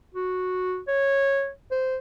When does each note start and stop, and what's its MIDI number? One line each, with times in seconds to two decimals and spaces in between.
0.15 0.80 66
0.88 1.50 73
1.71 1.98 72